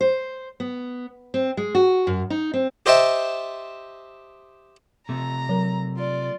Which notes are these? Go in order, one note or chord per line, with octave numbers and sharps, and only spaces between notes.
C5
B3
C4
G#3
F#4
F#2
D#4
C4
G4 C5 D#5 E5 G5 A5
C3 A3 A#5
F#3 A#4
F4 D5